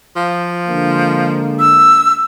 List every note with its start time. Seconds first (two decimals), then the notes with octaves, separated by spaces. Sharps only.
0.16 F3
0.68 D3 G#3 A#3
1.60 E6